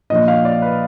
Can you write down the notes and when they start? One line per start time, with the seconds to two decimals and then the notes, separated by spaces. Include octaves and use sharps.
0.10 A#2 F3 A#3 D4 D#5
0.28 F5
0.45 D5
0.62 B4